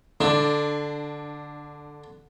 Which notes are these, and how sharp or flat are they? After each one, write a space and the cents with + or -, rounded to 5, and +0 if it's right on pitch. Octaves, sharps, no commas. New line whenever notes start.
D3 +0 D4 +20